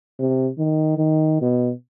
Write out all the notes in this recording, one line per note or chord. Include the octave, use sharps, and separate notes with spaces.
C3
D#3
D#3
B2